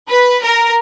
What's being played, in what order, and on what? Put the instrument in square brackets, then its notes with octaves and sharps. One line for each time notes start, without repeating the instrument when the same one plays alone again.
[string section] B4
A#4